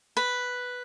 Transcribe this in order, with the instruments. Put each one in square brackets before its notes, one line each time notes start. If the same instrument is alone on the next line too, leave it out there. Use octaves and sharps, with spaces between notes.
[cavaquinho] B4